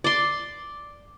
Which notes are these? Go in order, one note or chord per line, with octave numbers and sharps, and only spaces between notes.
D5 C6